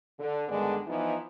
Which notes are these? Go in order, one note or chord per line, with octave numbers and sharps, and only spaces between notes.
D3
G2 D3 D#3 G#3 B3 D4
E3 F3 B3 D#4